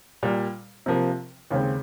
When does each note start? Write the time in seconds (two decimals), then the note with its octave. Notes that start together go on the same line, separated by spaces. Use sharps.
0.23 A#2 G3 A#3
0.86 C3 F3 A#3
1.50 D#2 C#3 G#3 C4